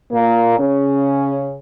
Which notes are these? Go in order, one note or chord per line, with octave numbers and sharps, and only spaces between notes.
A#2 A#3
C#3 C#4